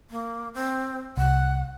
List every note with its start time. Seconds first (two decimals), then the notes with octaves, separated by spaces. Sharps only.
0.10 A#3
0.54 C4
1.17 C2 F#5